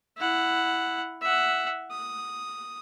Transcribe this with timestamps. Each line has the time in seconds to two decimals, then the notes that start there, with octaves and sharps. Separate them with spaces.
0.18 E4 F#5
1.21 E5 F#5
1.91 D#6